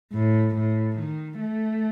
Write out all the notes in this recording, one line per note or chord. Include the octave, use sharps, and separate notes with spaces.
A2
A2
D#3
A3